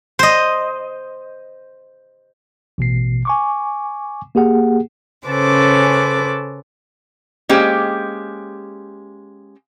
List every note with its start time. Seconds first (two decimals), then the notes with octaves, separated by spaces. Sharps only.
0.19 C5 D#5
2.78 A1 B2 C7
3.25 G#5 C#6 D6
4.35 A#3 G4 G#4 F#5
5.27 C#3 C#4 A4 B4 C5 D6
7.49 G#3 A#3 C#4 G4 C5 G5